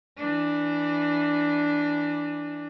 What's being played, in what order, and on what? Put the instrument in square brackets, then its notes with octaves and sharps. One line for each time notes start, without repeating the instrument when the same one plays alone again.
[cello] E3 D4